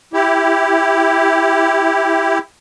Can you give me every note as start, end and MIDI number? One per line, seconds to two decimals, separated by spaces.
0.13 2.39 64
0.13 2.39 67